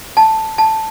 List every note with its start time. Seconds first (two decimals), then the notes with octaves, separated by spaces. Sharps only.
0.17 A5
0.58 A5